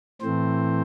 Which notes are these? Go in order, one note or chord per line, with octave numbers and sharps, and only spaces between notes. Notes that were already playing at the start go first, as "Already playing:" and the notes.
A2 E3 A3 C4 C5